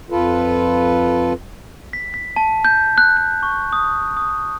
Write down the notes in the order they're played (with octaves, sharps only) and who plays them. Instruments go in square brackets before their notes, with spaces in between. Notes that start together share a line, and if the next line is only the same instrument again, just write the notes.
[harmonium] F2 F4 A4 B4
[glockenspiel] B6
B6
A5
G6
F#6
F#6
C#6
D#6
D#6